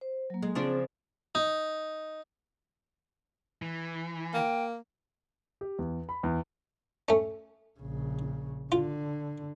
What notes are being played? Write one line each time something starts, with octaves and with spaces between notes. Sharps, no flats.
C5
F#3 A#3
G#3
C#3 F3 C4 D4 G#4
D#4
E3
A#3 G5
G4
E2
B5
E2
A3 C#4
A#1 C#3
D3 F4